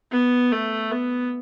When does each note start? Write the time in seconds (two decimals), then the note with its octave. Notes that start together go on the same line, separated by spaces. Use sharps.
0.12 B3
0.52 A3
0.91 B3